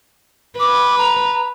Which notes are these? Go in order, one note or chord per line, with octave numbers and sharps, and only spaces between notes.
B4 D6
A#5